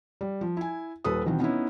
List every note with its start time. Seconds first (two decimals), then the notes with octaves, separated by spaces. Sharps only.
0.21 G3
0.41 F3
0.57 E4 G#5
1.04 D#1 D#2 A4 B4 D#6
1.26 B2 D#3 E3 B3 C4
1.40 B3 C#4 D#4 E4